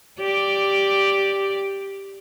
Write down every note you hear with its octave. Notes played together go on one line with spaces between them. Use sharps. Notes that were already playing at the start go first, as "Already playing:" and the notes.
G4 D5